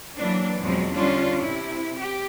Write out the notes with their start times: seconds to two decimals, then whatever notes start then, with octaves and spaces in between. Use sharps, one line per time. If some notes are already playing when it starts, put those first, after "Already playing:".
0.18 E3 F#3 A#3 D4
0.62 E2 B2 F3 F#3 G#3 C4
0.92 D3 G3 C#4 D4 F4
1.42 C3 E4
1.96 G4